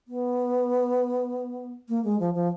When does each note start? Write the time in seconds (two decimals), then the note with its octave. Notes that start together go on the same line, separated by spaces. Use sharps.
0.08 B3
1.89 A#3
2.04 G#3
2.20 F3
2.34 F3